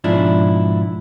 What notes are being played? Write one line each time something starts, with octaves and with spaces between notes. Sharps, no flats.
G#2 B2 F3 D4 E4